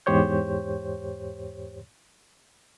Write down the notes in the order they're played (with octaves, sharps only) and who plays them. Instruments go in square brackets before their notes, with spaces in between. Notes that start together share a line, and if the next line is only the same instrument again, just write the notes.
[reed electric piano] E2 G#2 G4 C5 C#5 G6